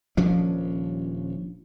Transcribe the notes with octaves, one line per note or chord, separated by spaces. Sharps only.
D#1 F3 C#4 D4